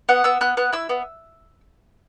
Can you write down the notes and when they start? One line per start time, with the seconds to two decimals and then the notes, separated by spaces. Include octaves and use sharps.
0.09 B3 F#5
0.24 B3 E6
0.41 B3 F#6
0.57 B3 F#6
0.72 E4 E6
0.89 B3